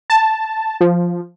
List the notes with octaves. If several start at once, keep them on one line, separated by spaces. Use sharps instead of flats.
A5
F3